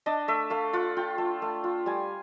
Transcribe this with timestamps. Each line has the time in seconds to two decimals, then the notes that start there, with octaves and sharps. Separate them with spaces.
0.06 D4 D#5
0.28 A3 E5
0.50 A3 F5
0.73 F4 F#5
0.97 F4 G5
1.18 A3
1.42 A3
1.64 F4
1.86 G3 G#5